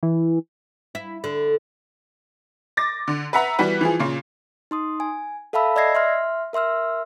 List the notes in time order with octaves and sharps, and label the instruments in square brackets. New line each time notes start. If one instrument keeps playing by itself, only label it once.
[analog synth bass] E3
[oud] E4
D3
[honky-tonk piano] D6 A6 A#6
D3
B4 E5 F#5 A#5
E3 G3 B3 F#4 B4
E3 F3 G#4
A#2 C#3
[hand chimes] D#4 C6 D#6
G#5
A4 E5 F5 A5 B5 E6
D5 D#5 E6 G#6 A#6 C7
E5 C6 F6
A#4 E5 C6 E6 F6